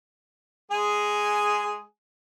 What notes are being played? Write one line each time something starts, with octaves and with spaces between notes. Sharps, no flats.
G#3 G#4 G#5